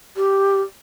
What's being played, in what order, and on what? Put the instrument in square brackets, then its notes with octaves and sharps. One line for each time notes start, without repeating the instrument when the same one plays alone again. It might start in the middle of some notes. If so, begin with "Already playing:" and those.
[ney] G4